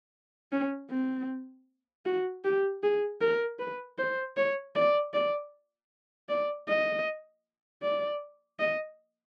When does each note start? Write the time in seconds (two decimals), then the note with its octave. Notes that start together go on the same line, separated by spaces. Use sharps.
0.52 C#4
0.90 C4
2.06 F#4
2.44 G4
2.83 G#4
3.21 A#4
3.59 B4
3.98 C5
4.37 C#5
4.75 D5
5.13 D5
6.29 D5
6.68 D#5
7.82 D5
8.59 D#5